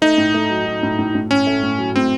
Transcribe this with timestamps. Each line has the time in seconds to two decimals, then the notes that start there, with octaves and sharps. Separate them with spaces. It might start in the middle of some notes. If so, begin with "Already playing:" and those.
0.02 A3 D#4
0.18 A2
0.34 A3
0.50 F#3
0.66 F#3
0.83 A2
0.99 A2
1.15 A2
1.31 A2 C#4
1.47 A3
1.63 A2
1.78 F#3
1.95 A2 C4